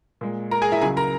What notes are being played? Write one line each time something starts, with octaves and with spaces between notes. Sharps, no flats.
A#2 G#3
A#4 A#5
G#4 G#5
E4 E5
C#2 C#3 F#3 G#4 G#5
A#4 A#5